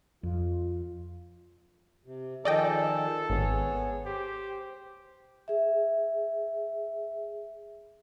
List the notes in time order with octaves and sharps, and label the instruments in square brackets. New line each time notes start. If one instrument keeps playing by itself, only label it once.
[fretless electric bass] F2 [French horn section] F4
[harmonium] C3
[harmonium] D#3 F3 G#4 [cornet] A4 [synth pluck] D5 D#5 G5
[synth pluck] G#1 [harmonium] B3 G#4 C#5
[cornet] G4 [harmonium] C5
[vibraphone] G#4 E5